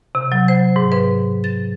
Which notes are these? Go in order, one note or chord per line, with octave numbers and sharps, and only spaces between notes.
C3
F#3
C5
G#2
B4
A6